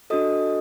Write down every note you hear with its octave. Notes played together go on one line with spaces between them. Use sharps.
D4 F#4 A4 D#5 D#6